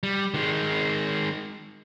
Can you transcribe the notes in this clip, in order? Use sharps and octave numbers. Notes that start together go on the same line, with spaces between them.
G3
D#3 G#3